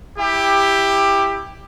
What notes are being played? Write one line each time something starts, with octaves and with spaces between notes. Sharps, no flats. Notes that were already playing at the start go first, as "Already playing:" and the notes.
E4 G4